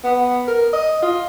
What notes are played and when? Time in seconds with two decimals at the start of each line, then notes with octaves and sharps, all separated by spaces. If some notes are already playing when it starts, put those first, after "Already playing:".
0.04 B3
0.48 A#4
0.73 D#5
1.02 F4